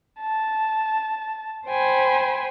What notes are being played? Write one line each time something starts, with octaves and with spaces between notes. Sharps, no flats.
A5
C5 G5 G#5 B5